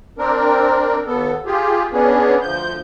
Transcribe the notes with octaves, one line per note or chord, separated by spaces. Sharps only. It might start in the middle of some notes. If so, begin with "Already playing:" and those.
C4 D4 A#4
D#2 B3 A4
F4 G4 G#4
B3 C#4 D4 G#4
D2 F3 G6